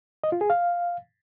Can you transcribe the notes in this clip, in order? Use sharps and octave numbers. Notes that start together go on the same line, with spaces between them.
D#5
F4
G#4
F5